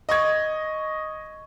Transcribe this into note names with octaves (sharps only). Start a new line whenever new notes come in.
D#5 C#6 G#6